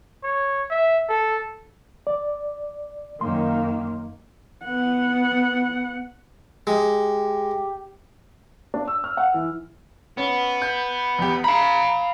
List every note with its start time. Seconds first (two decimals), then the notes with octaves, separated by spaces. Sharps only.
0.24 C#5
0.70 E5
1.10 A4
2.07 D5
3.21 F#2 D#3 A#3 C6
4.64 B3 F#5
6.67 G#3 G4
8.74 D4
8.88 E6
9.04 F6
9.17 F#5
9.34 E3
10.18 B3 C#4
10.62 G6
11.19 E2 G4
11.44 F5 A#5 B5